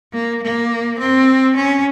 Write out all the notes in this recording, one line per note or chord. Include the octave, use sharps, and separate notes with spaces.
A#3
A#3
C4
C#4